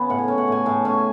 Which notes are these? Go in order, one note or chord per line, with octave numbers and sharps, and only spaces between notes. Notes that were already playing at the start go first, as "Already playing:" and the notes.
Already playing: C#3 B3
A2 F#5
G#5
C#4 F#5
F#5
A2 G#5
A2 A5
C#4 G#5